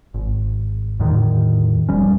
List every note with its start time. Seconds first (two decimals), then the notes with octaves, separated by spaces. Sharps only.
0.14 G#1
1.00 E2 A2 D3 D#3
1.89 E1 F3 G3 C#4